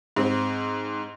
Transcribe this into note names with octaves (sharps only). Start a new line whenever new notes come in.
G#2 C4